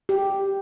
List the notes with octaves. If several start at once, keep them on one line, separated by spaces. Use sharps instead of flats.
G4